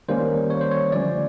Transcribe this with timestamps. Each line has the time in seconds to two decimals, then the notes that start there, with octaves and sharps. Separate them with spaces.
0.08 D#3 G3 A#3 C#4 C5
0.50 C#5
0.61 C5
0.71 C#5
0.92 D3 F3 A3 C#4 D5